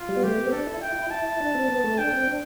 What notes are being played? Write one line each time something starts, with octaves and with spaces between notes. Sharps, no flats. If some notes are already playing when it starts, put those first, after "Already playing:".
Already playing: F4
G3
B3
A3 G4
B3
C4
D4 A4
E4
E4 G5
E4
E4 A5
D4
C4
B3
A3
D4 G5
C4
D4